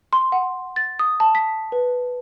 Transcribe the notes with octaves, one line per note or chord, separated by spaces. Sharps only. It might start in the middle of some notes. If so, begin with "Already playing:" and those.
C6
F#5
A6
D#6
A5
B6
B4